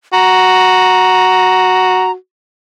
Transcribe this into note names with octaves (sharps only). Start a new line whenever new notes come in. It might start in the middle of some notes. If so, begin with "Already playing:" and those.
F#4 A#5